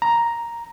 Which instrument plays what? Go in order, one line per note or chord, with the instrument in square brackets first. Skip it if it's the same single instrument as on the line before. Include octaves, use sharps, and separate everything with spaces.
[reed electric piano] A#5